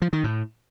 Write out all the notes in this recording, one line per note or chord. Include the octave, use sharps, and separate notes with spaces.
F3
D#3
A2